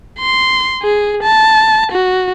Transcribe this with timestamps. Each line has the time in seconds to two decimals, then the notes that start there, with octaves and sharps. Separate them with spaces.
0.20 C6
0.82 G#4
1.23 A5
1.92 F#4